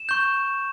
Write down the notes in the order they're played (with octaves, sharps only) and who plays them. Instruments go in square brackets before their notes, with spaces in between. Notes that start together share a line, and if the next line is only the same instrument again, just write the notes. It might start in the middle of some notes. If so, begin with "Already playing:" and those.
Already playing: [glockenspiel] E7
C#6 G6